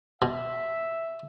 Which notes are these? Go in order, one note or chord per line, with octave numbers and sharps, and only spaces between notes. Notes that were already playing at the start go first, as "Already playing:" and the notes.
B2 E5